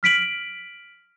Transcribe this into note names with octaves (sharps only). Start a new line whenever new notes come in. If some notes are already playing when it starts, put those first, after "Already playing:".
F6 B6 D7 F#7